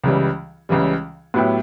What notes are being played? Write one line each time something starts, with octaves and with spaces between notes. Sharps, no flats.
C#2 C#3 E3 G3
C#2 C#3 E3 G3
A2 F#3 B3 E4 G4